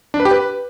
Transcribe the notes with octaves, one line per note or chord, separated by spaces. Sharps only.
D4
B4
G4
B4